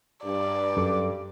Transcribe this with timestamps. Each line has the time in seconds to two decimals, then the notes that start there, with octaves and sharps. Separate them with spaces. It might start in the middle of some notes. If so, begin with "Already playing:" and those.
0.24 G2 D5
0.77 F#2 A4 D6